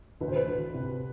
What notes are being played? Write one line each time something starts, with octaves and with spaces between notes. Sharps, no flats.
D2 B4
C5
B4
D2
C3